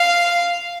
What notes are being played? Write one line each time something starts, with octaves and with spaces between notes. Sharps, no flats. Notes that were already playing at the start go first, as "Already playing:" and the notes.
Already playing: F5